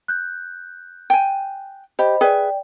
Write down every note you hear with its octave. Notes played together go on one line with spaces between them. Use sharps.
F#6 G6
G5 G#5
G4 C5 D#5 B5
G#4 B4 D5 E5 G5